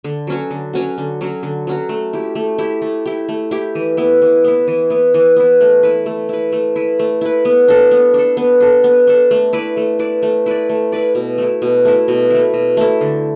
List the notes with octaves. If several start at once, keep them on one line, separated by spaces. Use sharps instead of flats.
D3
F#3 C#4 F#4
D3
F#3 C#4 F#4
D3
F#3 C#4 F#4
D3
F#3 C#4 F#4
A3
E4 G4
A3
E4 G4
A3
E4 G4
A3
E4 G4
E3
B3 E4
E3
B3 E4
E3
B3 E4
E3
B3 E4
A3
E4 B4
A3
E4 B4
A3
E4 B4
A3
E4 B4
B3
D4 A4
B3
D4 A4
B3
D4 A4
B3
D4 A4
A3
E4 B4 D5
A3
E4 B4 D5
A3
E4 B4 D5
A3
E4 B4 D5
B2
A3 E4
B2
A3 E4
B2
A3 E4
B2
A3 E4
D3